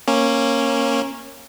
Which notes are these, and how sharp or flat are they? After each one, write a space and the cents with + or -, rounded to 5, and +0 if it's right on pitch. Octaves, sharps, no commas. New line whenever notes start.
A#3 +0 C#4 -15